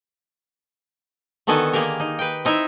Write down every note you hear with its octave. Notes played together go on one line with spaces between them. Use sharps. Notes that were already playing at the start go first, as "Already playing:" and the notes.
D3 D#3 B3 F#4 A4 G#5
A#3 G4 G#4 A#4
D#4
B4 G5
C4 D#4 E4 E5